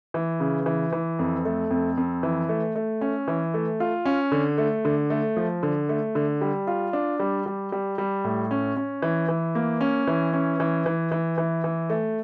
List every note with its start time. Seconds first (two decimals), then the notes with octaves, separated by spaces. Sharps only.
0.14 E3
0.40 C#3
0.66 E3
0.93 E3
1.19 F2
1.45 A3
1.71 F2
1.97 F2
2.23 E3
2.49 A3
2.75 A3
3.01 C#4
3.28 E3
3.54 A3
3.80 F4
4.05 C#4
4.32 D3
4.58 A3
4.85 D3
5.10 A3
5.37 F3
5.63 D3
5.89 A3
6.15 D3
6.41 G3
6.67 F4
6.93 D4
7.20 G3
7.46 G3
7.72 G3
7.98 G3
8.24 A2
8.51 C#4
8.76 C#4
9.02 E3
9.29 E3
9.55 A#3
9.81 C#4
10.07 E3
10.33 C#4
10.60 E3
10.86 E3
11.12 E3
11.38 E3
11.64 E3
11.90 A3